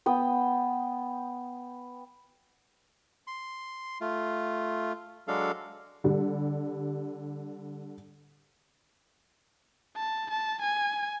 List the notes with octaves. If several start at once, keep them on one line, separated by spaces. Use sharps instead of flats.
B3 G5 D#6
C6
A3 F4
F#3 G#3 D4 A4 F5
D3 G3
A5
A5
G#5